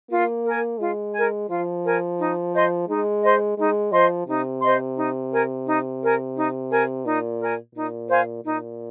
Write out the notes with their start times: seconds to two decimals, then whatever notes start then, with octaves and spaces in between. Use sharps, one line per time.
0.10 A#3 F4
0.45 A#4 G#5
0.79 G#3 F4
1.14 A#4 G#5
1.48 F3 F4
1.84 A#4 G#5
2.19 D#4
2.54 C5 D#5 C6
2.88 G#3 D#4
3.23 C5 D#5 C6
3.58 G#3 D#4
3.92 F3 C5 D#5 C6
4.27 C3 D#4
4.61 C5 D#5 C6
4.96 D#4
5.31 A#4 G#5
5.65 D#4
6.01 A#4 G#5
6.35 D#4
6.70 A#4 G#5
7.05 A#2 D#4
7.40 A#4 G#5
7.74 A#2 D#4
8.09 C5 F5 G#5
8.44 A#2 D#4